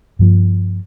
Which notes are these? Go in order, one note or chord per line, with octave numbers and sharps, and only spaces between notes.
G2 F3 A#3